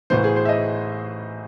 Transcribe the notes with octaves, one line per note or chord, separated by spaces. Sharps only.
A1 A2 E3 C5
G#4
C5
E5
D#5